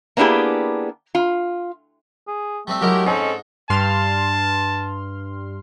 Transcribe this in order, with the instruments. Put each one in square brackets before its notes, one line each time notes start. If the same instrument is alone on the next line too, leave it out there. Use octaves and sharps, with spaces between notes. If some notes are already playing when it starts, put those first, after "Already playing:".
[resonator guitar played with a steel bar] A#3 B3 D4 E4 G4 G#4
F4
[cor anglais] G#4
[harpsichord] G3 C4 E5 [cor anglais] A3
[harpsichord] F#3 G#3 E4 [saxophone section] G4 A#4
[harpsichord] G#2 [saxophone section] C4 D#4 A4 [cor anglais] C#4
[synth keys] G2 C6 F6 [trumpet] A5